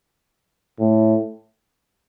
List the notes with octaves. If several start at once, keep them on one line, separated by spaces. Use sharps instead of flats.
A2